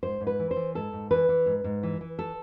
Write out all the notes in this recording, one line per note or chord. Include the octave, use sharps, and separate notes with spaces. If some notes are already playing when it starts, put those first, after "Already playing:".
G#2 C5
G#2
B4
E3
C5
E3
G#2 A4
G#2
E3 B4
E3
G#2
G#2
E3
E3
A4